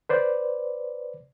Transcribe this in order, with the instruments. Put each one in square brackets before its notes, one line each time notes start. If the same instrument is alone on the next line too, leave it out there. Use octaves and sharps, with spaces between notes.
[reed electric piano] B4 C5 D5